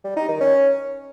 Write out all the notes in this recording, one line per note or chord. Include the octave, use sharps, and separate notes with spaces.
G3
D#4
D#3
C#4